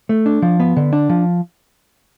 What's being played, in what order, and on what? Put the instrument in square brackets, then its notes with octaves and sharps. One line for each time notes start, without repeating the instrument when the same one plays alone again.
[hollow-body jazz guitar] A3
D4
F3
B3
D3
D4
F3